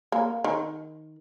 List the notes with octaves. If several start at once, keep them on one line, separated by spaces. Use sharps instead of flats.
A#3
D#3